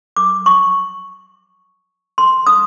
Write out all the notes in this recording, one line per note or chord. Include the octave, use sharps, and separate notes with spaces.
D6
C#6
C6
D#6